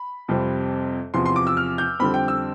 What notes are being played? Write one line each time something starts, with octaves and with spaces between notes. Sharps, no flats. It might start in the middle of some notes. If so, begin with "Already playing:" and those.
Already playing: B5
F2 C3 G3 C4
E2 C3 F3 C6
C6
D6
E6
F6
G6
F2 D3 G3 C4 B5
G5
E6